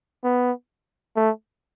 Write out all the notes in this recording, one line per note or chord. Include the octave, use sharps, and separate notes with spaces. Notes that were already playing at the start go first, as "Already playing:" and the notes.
B3
A3